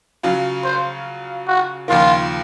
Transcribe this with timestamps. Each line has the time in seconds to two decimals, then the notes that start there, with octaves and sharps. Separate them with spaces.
0.23 C#3 F#3 C#4 F4
0.65 C5
1.48 F#4
1.88 D#2 C#3 F3 A#3 F4